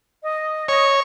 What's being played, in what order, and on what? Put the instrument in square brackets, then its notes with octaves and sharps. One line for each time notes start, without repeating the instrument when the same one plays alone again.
[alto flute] D#5
[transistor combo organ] C#5